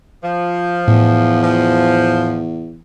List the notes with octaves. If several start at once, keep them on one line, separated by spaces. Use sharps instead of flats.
F3
E2 A2
F3